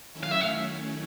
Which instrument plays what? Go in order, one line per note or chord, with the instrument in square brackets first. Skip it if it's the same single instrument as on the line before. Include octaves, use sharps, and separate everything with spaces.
[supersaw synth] D#3 F#3 A3 C#4 E4
[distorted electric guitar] F5
E5
F5